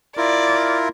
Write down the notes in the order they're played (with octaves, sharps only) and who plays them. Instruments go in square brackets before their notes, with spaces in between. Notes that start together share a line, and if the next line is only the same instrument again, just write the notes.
[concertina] E4 F4 A#4 [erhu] D5